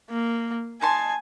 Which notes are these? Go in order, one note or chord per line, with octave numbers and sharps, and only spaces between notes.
A#3
D#4 G#5 A5 C6